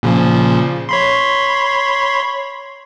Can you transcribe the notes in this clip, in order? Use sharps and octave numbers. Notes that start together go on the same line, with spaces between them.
A#2 C#3 F3
C#5 B5 C6